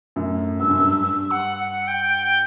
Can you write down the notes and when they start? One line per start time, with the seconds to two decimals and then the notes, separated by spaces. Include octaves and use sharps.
0.16 F#2 A2
0.59 G2 E6
0.70 F#2
0.79 G2
1.02 G2 E6
1.31 F#5
1.59 F#5
1.88 G5